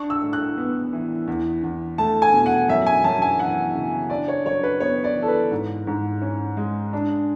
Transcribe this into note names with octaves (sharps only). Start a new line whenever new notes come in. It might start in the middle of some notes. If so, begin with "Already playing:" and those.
Already playing: D4 C#6
E6
A2
F#6
B3
E3
E2
E2
A3 A5
G#5
B2
F#5
F#2 E5
G#5
F#2 A5
G#5
E3 F#5
C#3
D4 D5
C#5
F#2 C#5
B4
B3 C#5
D5
E3
A4
B4
G#2
G#2
C#4
G#3
D4